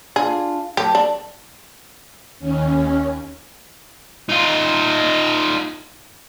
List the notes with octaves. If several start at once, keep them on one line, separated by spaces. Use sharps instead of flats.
D4 F4 G#4
F#3 G4 A4
D4
D#2 C#4
D#4 F4